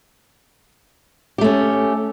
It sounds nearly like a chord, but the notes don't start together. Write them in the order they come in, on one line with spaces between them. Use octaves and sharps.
G4 A3 C#4